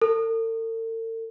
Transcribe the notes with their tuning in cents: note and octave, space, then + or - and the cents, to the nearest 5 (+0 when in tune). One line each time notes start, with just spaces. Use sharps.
A4 +45